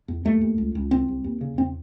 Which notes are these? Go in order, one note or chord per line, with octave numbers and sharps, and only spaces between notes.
E2
D#2 A3
D#2
C#2
C#2
C2 C4
C2
D#2
C#3
E2 C4